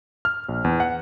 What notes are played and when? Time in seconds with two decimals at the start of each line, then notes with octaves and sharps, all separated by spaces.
0.25 F6
0.49 A#1
0.64 E2
0.80 F#5